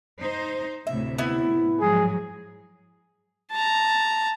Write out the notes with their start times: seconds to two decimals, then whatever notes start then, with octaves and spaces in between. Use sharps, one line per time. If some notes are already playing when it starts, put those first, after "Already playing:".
0.19 D#4 C5
0.87 D2 A2 C3 E5
1.18 B3 E4
1.81 G#2 F3 F#3 G#4
3.52 A5 A#5